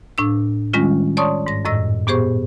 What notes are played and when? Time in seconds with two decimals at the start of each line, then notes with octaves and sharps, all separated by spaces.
0.18 A2 D4 E6
0.73 D#3 G3 G#3 C#4 F4
1.17 C#5 D5 A5 C6 C#6 D#6
1.46 G#2 A#6
1.65 F#2 A2 D#5 E6 A#6
2.07 A#2 B3 G4 G#4 C5 C#6